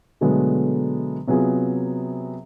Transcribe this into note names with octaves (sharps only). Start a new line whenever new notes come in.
B2 D3 F#3 G#3 A3 B3
C3 F#3 B3 F4 G#4